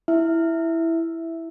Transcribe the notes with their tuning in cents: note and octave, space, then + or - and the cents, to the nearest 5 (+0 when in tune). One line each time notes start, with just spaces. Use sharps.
E4 +0 E5 +0